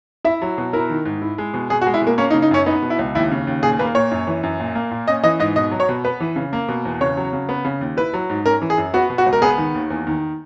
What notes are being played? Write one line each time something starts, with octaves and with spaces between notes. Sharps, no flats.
E4 E5
F#3
B2
E4 A#4
D#3
G#2
E4
G#3
B2
B2 G#4
F#4
G#3
E4
B2 A#3
A#3 C#4
D#4
C#3
D#4
F#2 C#4
B3 D#4
B2
E4
C#2
D#2 E4
C#3
D#2
A#2 G#4
A#3 B4
A#2 C#5
F#2
E3
F#2
A#2
A#3
A#2
C#4 D#5
E3 D#5
G#2 D#5
B2 D#5
F#3
C#5
B2
B3 B4
E3
C#3
A#3
B2
E2
C#3 C#5
F#3
C#3
B3
C#3
D#2
E4 B4
F#3
G#2
C#4 A#4
E3
G#4
F#2
B3 F#4
B2
F#4
C#2
A#4
B3 G#4
D#3
D#2
E2
D#3